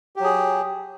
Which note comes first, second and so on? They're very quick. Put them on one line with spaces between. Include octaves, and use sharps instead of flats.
G4 F#3 G#4